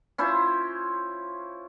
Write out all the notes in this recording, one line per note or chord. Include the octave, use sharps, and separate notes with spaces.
C#4 E4 F4 C5